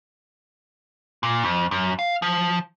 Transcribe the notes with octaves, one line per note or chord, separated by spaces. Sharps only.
A#2
F2
F#2
F5
F3